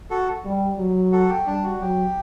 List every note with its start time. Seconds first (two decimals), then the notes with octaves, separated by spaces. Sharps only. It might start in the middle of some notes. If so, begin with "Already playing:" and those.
0.10 F#4 A4
0.45 G3
0.78 F#3
1.12 F#4 A4
1.29 G4
1.46 G3 D4
1.63 F#4
1.80 F#3 G4